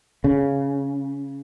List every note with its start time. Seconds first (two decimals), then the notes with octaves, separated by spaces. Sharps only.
0.24 C#3